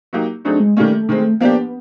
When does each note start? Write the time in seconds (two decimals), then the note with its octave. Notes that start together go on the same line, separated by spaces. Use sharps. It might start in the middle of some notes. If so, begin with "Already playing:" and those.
0.13 F#3 A#3 D#4 G4
0.45 F#3 A3 C4 D4 D#4 G#4
0.60 G#3
0.77 D#3 G3 A3 A#3 C#4
1.09 D#3 G#3 C4
1.40 F3 A#3 B3 D4 G4